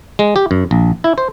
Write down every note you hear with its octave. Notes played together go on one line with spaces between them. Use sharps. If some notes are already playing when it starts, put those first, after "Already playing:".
G#3
G4
F#2
A#1
E4
C5